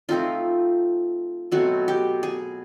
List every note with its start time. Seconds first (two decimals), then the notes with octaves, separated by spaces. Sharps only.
0.09 F3 A3 C4 D#4 F4
1.52 B2 F#3 A3 C4 F#4
1.88 G4
2.23 G#4